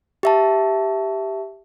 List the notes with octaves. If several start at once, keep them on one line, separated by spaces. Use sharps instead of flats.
G4 E5 A5